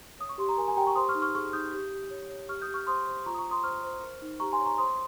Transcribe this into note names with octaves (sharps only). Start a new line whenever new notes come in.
C#5 D#6
C#6
G4 C6
A#5
A#4 G#5
G#5
G4 G5 A#5
A#5 C#6
C5 C6 D#6
C#6 F6
D#4
C#6 F6
G#4 C#6 F6
D#4 D#6 G6
G4
G4
C#5
C#5
G4 C#6 F6
D#6 G6
G4
C#6 F6
C5 C6 D#6
C5
F4 A#5 C#6
D#6
A#5 C#6
F4
C6 D#6
C5 C#6 F6
C5
A#4
D#4
G4 A#5 C#6
G#5 C6
C#5
A#5 C#6
C5 C6 D#6